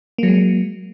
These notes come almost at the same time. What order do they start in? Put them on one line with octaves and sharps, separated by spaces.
A#3 F#3 G#3